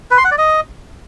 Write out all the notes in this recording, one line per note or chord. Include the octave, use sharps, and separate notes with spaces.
B4
C6
F#5
D5
D#5